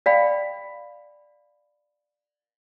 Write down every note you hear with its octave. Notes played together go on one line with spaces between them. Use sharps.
D5 F5 G5 B5